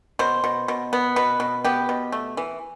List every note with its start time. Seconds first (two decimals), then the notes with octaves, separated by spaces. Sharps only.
0.19 B2 C5
0.44 B2
0.68 B2
0.93 B3
1.16 B2 B4
1.40 B2
1.64 B3 G4
1.89 B2
2.12 A3
2.37 E3